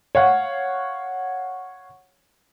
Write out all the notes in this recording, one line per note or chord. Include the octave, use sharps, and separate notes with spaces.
C#5 F5 F#5